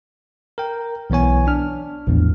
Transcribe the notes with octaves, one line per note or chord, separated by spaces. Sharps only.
A#4 G5
B1 E3 B3 C#5 G#5
D4 F6
A#1 E2 A2